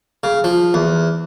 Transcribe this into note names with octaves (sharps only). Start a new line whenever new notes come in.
C#3
F3
E2